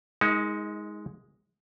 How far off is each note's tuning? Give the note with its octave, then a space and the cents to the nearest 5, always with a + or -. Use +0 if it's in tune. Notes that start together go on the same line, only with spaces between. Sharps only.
G#3 +0 D#4 +30 A#4 +0